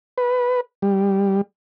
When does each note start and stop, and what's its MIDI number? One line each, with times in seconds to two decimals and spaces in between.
0.18 0.61 71
0.82 1.41 55